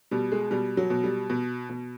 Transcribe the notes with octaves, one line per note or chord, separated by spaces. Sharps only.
B2 G3
G#3
B2 G3
F#3
B2
G3
B2
B2